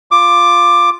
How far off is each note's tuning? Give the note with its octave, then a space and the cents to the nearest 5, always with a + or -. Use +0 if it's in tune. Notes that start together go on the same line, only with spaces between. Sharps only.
F4 +0 D6 +10